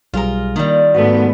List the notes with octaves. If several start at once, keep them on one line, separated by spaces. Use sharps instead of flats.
B1 G3 F4 G#4 A#4
D#3 G3 A#3
G#2 A3 B3 F#4 A4